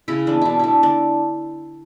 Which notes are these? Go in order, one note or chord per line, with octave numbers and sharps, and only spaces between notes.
C#3 E4
E3 G#3 B3 D4
B2 D4 E4
A3 D4 E4
D3 D4